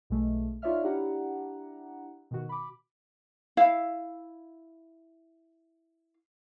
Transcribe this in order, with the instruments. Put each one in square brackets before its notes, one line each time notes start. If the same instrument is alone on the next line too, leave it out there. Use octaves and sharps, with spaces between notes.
[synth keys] B1 B2 G#3 A3
D#4 F4 C#5 D5 E5 F6
D4 E4 G4 F#5 A#5
B2 D#3 F#4
B5 D6
[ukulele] E4 F5